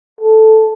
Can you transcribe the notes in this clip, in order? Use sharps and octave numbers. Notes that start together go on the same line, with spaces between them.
A4